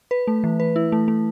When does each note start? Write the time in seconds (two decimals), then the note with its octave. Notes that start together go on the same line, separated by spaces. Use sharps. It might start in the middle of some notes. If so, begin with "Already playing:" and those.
0.11 B4
0.27 A3
0.44 E3
0.60 B4
0.76 E4
0.92 A3
1.08 A3